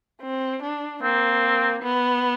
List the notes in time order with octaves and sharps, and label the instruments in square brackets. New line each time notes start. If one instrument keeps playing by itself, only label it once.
[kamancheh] C4
D4
[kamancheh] A#3 [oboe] C4
[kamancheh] B3